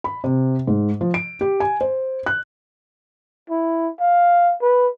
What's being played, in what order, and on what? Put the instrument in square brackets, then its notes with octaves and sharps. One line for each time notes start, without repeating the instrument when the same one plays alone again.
[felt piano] B5
C3
G#2
F3
D7
G4
G#5
C5
F#6
[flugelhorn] E4
F5
B4